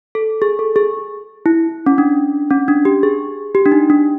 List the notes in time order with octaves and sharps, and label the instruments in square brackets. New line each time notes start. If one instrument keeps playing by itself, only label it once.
[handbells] A4
G#4
A4
G#4
E4
C#4
D4
C#4
D4
G4
G#4
G4
D4
D#4
D4